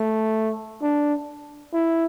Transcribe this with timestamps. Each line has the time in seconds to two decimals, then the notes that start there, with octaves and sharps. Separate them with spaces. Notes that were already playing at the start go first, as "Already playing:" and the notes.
Already playing: A3
0.82 D4
1.73 E4